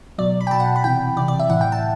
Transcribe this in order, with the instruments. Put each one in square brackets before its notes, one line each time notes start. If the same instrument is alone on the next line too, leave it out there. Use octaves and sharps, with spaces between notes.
[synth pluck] B2 F#3 D5
B5
G5
B2 F#3 A5
F#5
B5
C3 E3 G5
E3 D5
C3
D5
E5
A2 E3 F#5
G5
A5